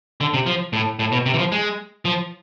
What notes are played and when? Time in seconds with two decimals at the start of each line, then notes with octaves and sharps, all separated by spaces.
0.21 D3
0.34 C3
0.46 F3
0.73 A2
0.99 A2
1.12 B2
1.26 C3
1.34 E3
1.39 F3
1.52 G#3
2.05 F3